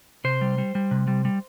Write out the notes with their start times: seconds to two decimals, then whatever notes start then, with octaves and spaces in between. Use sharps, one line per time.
0.24 C3 C5
0.41 G3
0.58 G3
0.75 G3
0.91 C3
1.08 G3
1.25 G3